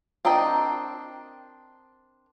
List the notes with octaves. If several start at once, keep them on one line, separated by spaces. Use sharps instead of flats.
C4 D4 A#4 D#5 G5